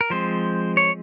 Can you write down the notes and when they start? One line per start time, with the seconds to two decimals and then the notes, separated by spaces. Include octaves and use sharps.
0.01 A#4
0.10 F3 G#3 C4 C5
0.77 C#5